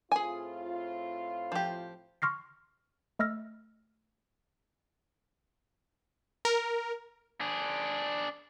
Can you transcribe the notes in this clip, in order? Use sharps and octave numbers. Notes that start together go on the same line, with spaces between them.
A2 C4 F4 G#4 G#5
F3 G4
C6 C#6 F6 A#6 C7
A3 D#5 E6 F6 A#6
A#4
D4 G#4